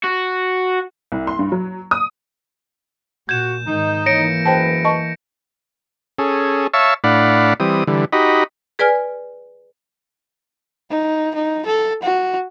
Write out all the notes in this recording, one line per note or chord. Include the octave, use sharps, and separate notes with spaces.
F#4
C2
C6
G2
F#3
D#6
A#2 F#4 G6 G#6 E7
G#2 D#3 D#4
E3 A#3 C#5 A#6 C#7 D7
F#2 G#3 B4 C5 G5 A5
D#5 A5 C#6
C#4 G#4 A4
C#5 E5 F5 A5 C#6 E6
A2 D4 D5 F5 F#5 B5
E3 G3 C4 D#6
D3 E3 G3
D#4 F#4 G4 D#5 B5
G#4 B4 D5 G#5 F6
D#4
D#4
A4
F#4